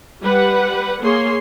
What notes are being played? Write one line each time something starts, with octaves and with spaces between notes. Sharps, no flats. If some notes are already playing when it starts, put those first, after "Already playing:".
G3 B4 F#5
A#3 G#4 C#5 C6